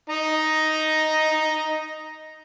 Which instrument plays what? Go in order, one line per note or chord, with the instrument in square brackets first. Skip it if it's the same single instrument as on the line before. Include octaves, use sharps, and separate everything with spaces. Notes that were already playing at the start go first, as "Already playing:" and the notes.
[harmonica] D#4 D#5 A#5